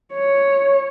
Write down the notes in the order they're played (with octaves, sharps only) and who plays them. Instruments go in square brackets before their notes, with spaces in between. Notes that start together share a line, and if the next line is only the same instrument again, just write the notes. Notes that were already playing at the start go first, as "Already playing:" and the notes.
[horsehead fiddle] C#5